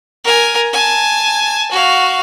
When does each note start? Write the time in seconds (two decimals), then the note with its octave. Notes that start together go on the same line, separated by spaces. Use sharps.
0.24 A#4 G#5
0.73 G#5 A5
1.71 F#4 F5